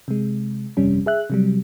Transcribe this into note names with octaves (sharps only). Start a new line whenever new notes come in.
C3 G#3
G1 F2 C3 G3 C#4
G#4 E5 F#6
C3 F#3 G3